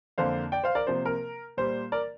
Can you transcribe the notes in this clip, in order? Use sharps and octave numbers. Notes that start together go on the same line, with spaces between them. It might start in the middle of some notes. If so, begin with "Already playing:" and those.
F2 D3 A#3 C5 F5
D5 G5
C5 F5
A#4 D5
C3 F3 A#3 C5
A#4
A#2 G3 A#3 C5
A#4 D5